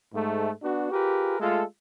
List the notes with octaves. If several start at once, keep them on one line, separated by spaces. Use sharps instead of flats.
G#2 A3
B3 D4 F#4
F4 G4 G#4 A#4 B4
G#3 A3 F4 A4